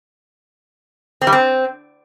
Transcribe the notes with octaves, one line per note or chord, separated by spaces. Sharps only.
C4
G3
C4